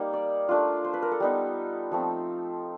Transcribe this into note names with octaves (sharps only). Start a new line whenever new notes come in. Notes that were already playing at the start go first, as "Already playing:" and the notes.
Already playing: G3 A#3 D#4
D5
A3 D4 F4
C5
B4
A#4
A4
G3 B3 D#4
F3 A3 C4